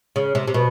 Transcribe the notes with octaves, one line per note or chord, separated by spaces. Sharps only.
C#3
C3
C3
B2